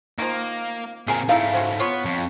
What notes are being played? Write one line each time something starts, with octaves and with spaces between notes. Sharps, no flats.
D#3 F3 A#3
A#2 C4 G#4 A#4 G#5
G#2 A3 D#4 E4 F5
C4 C#4 F#4
B3 F4 C#5
F2